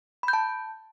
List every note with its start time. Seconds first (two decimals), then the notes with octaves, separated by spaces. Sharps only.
0.23 B5
0.28 G6
0.33 A5